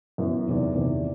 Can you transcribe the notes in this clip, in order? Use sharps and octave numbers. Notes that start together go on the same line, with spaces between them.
F#2 E3 B3 F#4
E2 C3 D#3
E2 C3 D#3